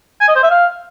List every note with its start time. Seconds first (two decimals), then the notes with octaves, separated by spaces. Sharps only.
0.21 G#5
0.28 D#5
0.36 C5
0.43 E5
0.51 F5